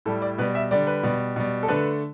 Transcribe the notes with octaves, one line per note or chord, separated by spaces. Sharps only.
A2 G3 A4
D5
B2 G3 B4
E5
D3 G3 D5
B4
B2 G3
B2 G3
A4
D3 A3 B4